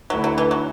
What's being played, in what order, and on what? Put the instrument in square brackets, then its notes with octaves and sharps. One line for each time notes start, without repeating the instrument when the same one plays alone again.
[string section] D2 D3 A3 E4 [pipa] F#3
[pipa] F#3
E3
F#3